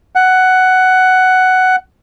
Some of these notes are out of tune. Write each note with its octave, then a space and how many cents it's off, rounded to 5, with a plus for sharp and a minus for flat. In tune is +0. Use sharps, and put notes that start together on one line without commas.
F#5 +10